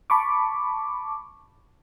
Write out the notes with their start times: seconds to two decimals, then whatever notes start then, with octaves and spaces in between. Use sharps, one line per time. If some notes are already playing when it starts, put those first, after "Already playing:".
0.10 A5 B5 C#6 D6